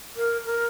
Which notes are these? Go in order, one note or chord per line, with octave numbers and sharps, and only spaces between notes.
A#4
A#4